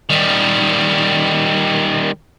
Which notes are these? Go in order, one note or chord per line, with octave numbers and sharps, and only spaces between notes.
D#3 G3